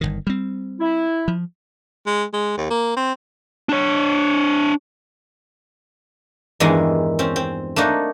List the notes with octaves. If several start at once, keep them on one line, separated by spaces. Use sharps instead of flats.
G1 C2 D#3
G3 C4
E4
F3
G#3
G#3
D#2
A#3
C4
D4 C#5
E2 G2 D#3 E3 G#3 E4
C4 C#4
C4
A3 A#3 D4 D#4